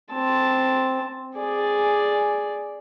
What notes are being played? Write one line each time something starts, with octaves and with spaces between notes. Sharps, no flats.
C4 A5
G#4 D5